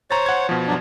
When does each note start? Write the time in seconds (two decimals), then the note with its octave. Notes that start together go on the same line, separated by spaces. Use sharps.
0.11 C5 C#5 A#5 A6
0.26 F#5 G#6
0.49 B2 F3
0.67 G2 F#3 D4